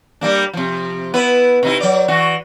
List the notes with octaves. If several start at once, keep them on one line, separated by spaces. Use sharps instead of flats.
G3 A#3 D4
C3 F3
B3 E4 B4
C3 D#4 E4
F#3 D5
E3 F#4